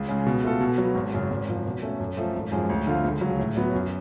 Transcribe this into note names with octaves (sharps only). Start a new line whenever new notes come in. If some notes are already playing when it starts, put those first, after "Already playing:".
Already playing: C#2
C#3 G#3
B2
A3 F4 A4
B2
F#3 B3
G#1
F#2 C#3
G#1
F#2 F3
B2
A3 C#4
F#2
F3 A3
G#1
F#2 F3 G#3
D2
D3 F3 A3 F4
C#2
F#3
C#3
A2
F#3 B3 F#4
F#2